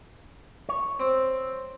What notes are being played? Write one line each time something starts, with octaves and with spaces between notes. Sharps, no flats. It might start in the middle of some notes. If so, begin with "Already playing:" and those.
C#5
C4